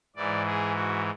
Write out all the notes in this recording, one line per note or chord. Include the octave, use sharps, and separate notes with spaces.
G#2 E3 D5
G#4
F#4